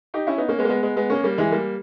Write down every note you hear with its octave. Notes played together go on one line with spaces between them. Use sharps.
D#4 G4
C#4 E4
B3 D#4
A#3 C#4
G#3 B3
A#3
G#3 B3
G#3 B3
G#3 B3
A#3 C#4
G3 A#3
E3 G#3
G3 A#3